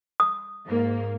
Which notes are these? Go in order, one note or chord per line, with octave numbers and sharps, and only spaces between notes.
D#6
G#2 A#3